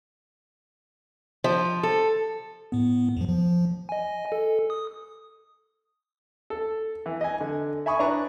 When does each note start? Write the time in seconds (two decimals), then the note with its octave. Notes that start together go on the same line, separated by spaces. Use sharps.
1.44 F3
1.83 A4
2.72 A2 B3
3.17 F2 F3
3.28 F3
3.89 D#5 G#5
4.32 A4
4.70 D#6
6.50 A4
7.06 E3
7.21 D#5 G#5
7.41 D3
7.86 E5 G#5 B5 C#6 D#6
7.99 D4 E4 B4 C#5 A#5 C#6